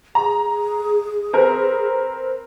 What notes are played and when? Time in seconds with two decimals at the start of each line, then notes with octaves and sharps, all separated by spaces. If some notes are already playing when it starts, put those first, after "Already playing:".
0.15 G#4 A#5
1.33 C4 A#4 B4